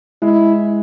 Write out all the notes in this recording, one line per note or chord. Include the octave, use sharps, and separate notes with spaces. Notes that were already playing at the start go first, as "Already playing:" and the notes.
G#3 E4